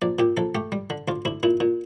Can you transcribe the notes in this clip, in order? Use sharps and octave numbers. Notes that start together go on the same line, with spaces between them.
A#1 D5
A#2 G4
A#1 A4
A3 G4
G3
D3
D2 F4
D2 E4
A#2 E4
A#2